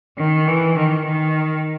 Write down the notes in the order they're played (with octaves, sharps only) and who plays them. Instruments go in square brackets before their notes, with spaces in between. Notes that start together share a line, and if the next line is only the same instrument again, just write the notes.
[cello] D#3
E3
D#3
D#3